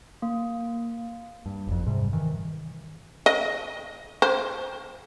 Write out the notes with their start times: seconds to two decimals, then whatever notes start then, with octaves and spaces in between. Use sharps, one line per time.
0.22 A#3
1.46 G2
1.67 F#1 F2
1.86 G#2 C3 G3
2.13 D#3 E3
3.26 D#5
4.22 C5